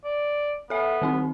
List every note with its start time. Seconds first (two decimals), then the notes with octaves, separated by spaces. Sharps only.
0.04 D5
0.70 B3 A4 E5
1.02 D#3 C4 D#4